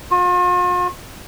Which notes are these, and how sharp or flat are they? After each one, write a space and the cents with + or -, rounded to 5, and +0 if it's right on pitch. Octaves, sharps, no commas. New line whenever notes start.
F4 +45